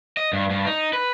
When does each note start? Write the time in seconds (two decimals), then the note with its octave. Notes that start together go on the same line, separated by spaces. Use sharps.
0.17 D#5
0.33 G2
0.50 G2
0.66 D#4
0.93 B4